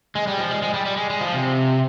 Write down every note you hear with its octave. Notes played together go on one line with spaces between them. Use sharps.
G#3
G3
F3
G#3
G#3
G3
G3
G#3
G#3
F3
C3